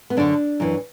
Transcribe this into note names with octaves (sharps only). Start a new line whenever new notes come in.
B3
F#2 D3 D4
F#2 E3